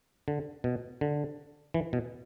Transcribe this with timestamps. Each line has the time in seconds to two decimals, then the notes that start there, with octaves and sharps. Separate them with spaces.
0.28 D3
0.64 B2
1.01 D3
1.74 E3
1.93 B2